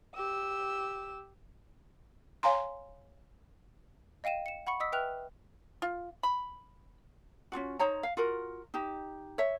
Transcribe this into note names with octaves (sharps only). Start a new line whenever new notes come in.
G4 E6
C#5 F5 G#5 A#5 C6
D#5 F5 G5 D#7 E7
C#7 E7
F#5 B5 C#6 C#7
D#5 D#6 E6 B6
B4 E5 G5 F6 F#6 F7
F4
B5
C#4 D4 F4 F#4
D#4 C5 C#5 A#5
F5
F4 F#4 A#4
D#4 G4
C#5 E5